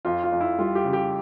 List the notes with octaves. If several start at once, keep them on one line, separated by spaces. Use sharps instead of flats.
F2 F4
F4
F2
E4
G3 F4
G4
C#3
G4